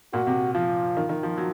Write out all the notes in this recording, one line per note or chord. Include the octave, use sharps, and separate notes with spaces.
A#2 F#4
C3
F3 F4
D#3
D#3
F3
F#3